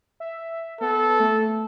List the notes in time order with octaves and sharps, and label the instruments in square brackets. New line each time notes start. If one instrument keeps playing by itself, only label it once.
[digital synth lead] E5
[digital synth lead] B3 [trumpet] A4
[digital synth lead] A3